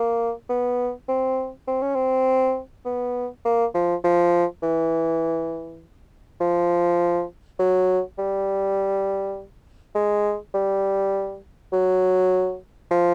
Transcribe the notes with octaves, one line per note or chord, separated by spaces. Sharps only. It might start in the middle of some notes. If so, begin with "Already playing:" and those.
Already playing: A#3
B3
C4
C4
C#4
C4
B3
A#3
F3
F3
E3
F3
F#3
G3
G#3
G3
F#3
F3